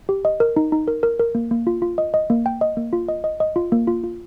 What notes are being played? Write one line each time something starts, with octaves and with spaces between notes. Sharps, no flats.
G4
D#5
A#4
D#4
D#4
A#4
A#4
A#4
A#3
A#3
F4
F4
D#5
D#5
A#3
G5
D#5
A#3
F4
D#5
D#5
D#5
F4
A#3
F4
F4